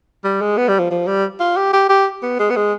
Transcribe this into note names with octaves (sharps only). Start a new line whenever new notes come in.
G3
G#3
B3
G3
F3
F3
G3
F4
G4
G4
G4
B3
G#3
B3
G#3